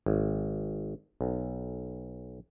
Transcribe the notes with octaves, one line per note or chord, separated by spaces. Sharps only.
G#1
B1